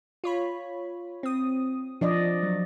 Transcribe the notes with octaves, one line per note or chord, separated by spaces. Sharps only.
F4 C#5 B5
C4 D#6
F3 D4 D5 D#5
F#3